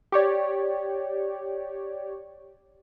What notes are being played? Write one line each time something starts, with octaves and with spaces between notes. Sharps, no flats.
G4 C#5 D5